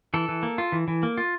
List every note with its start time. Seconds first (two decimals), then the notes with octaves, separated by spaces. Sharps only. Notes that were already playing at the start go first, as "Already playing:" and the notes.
0.14 E3 A4
0.29 E3
0.43 A#3
0.58 F4
0.72 E3
0.88 E3
1.03 A#3
1.18 F4